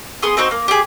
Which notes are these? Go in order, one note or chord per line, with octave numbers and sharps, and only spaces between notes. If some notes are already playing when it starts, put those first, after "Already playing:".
B3 G#4 C6 D#6
C4 D#4 F#4 C5
A#3
G4 G#4